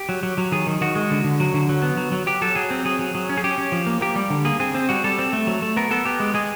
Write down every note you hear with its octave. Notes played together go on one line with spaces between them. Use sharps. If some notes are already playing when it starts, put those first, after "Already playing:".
Already playing: G4
F#3
F#3
F#3
D#3 G#4
D#3
D#3 F#4
G#3
D3
D3
F#3
D3
F#3
B3
F#3
F#3
F#3 G4
F#3 A4
F#3 G#4
C4
F#3 G#4
F#3
F#3
C#4
G#4
C#4 G4
C#4
F3
A#3
A#3 G4
G3
D3
A#3 G#4
C4 G#4
C4
G3 F#4
G3 A4
C4
A3
F#3
A3
B3 A#4
B3 A4
B3 G4
G#3
G#3 G#4